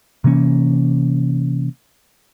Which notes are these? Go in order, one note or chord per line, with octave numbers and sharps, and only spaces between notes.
C3 E3 A#3 C#4